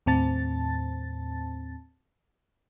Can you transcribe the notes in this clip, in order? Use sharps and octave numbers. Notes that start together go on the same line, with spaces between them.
D#2 A2 C4 A5 A6